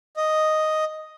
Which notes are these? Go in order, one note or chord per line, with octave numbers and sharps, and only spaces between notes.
D#5